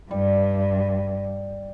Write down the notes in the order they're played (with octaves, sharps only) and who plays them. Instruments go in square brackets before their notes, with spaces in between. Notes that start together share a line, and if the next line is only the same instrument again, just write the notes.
[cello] G2 [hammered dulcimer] G3